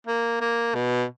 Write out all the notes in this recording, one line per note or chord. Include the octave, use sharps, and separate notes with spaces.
A#3
A#3
B2